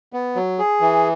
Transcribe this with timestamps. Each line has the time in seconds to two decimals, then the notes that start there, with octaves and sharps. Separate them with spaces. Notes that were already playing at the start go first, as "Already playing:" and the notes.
0.13 B3
0.36 F#3
0.59 G#4
0.81 E3